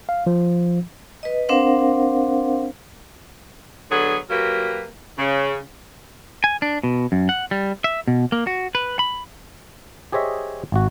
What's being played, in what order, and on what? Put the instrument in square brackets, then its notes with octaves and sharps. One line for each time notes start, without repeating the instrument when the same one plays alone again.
[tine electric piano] F5
F3
[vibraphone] B4 D#5
C4 D4 A#4 C5 F5 F#5
[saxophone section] D3 F#3 B3 D4 G#4
F#3 A#3 G4 A#4 B4
C#3
[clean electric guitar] G#5
D4
B2
F#2
F#5
G3
E5
B2
A#3
F#4
B4
B5
[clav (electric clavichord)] G4 G#4 C5 C#5 D#5 E5
G#1 F#4